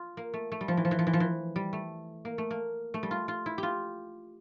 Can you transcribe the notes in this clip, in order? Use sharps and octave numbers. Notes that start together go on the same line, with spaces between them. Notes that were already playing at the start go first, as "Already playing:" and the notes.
Already playing: F4
A#3
A3
A3
G3
F3
E3
F3
E3
F3
E3
F3
E3
G3
A3
A#3
A3
A#3
A3
G3
F4
F4
E4
G4
F4